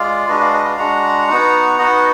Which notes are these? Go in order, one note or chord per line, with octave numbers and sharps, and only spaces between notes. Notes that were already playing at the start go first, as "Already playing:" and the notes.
Already playing: G#3 F4 D5 F5
G#3 D4 F#4 B4 D#5
D5 F5
B4 D#5
D5 F5
G#3 D4 F#4 F#5 A#5
B3 D#4 F#4
B3 D#4 F#4 D#5 F#5